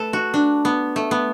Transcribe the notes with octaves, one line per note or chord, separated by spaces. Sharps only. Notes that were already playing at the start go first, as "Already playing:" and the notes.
Already playing: A3 A4 B4
F#4
D4
B3
A3
B3